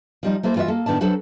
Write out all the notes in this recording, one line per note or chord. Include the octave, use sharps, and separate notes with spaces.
F3 G3 D#4
A3 A#3 E4 A4 C5
E3 F4 F#4 D#5 E5
A#3 A4
A2 D#3 B3 D4 A5
F#3 D4 A4 B4 C5